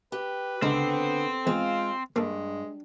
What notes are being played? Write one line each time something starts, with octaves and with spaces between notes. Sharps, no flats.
G4 B4
C#2 D3 B3 C4 D#4
E2 G#3 F4 F5
G2 G#3 A#3 A4